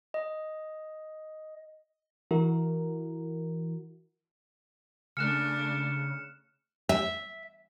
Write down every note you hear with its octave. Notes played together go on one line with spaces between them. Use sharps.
D#5
E3 E4 F#4 A#4
C#3 A3 D4 F6 F#6 C#7 E7
E5